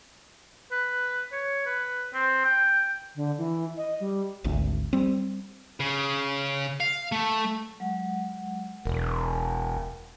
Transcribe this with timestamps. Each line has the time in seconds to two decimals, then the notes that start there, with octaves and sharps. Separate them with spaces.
0.71 B4
1.32 C#5
1.66 B4
2.14 C4
2.45 G5
3.16 D3
3.38 E3
3.77 D#5
4.00 G3
4.44 G#1 D2
4.93 G3 C4
5.80 C#3
6.80 F5
7.12 A3
7.80 F#3 G#3 F#5
8.85 E1 A#4